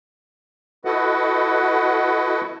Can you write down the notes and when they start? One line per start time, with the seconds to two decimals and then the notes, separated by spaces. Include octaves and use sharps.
0.85 E4 F#4 A4 B4 D#5 F#5